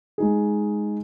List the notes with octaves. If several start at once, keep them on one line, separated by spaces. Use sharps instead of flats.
G#3 D#4 G#4